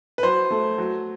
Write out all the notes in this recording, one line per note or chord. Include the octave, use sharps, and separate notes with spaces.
B4
F#3 C5
A3
F#3